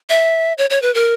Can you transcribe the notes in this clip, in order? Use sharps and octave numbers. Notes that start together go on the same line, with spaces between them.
E5
C#5
C#5
B4
A#4